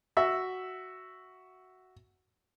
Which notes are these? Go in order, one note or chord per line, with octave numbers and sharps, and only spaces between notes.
F#4 E5